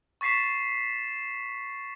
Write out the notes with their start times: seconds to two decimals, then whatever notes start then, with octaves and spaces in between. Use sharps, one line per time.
0.21 C#6 A6 B6 C7 E7